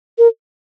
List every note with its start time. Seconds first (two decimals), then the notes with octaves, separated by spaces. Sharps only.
0.18 A#4